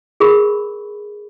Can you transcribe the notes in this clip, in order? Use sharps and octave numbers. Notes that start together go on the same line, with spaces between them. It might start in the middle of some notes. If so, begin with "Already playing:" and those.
G#4 A#4 B5 C#6